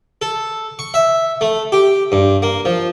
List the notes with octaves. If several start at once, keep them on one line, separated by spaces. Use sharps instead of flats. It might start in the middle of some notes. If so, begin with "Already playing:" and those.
A4
C#6
E5
A3
G4
G2
A#3
F3